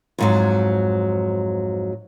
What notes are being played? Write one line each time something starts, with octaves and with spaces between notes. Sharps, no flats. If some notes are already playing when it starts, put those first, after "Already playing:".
F2 G#2 F#3